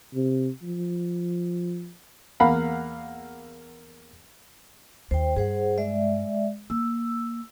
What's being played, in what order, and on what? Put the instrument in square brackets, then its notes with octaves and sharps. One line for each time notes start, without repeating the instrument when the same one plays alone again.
[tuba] C3
F3
[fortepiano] E2 A#3 F5 F#5 A#5 B5
[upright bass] D#2 [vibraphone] C5 G5
[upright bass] G2 [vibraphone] G#4 C5 F#5
[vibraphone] G#3 D5 E5
[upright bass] A#3 [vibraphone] E6